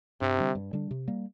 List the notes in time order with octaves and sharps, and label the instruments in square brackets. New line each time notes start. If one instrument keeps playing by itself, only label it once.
[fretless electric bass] G2 [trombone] C3
[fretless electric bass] D3 G3 D4
G2
D3 G3 D4
C3
G3 A#3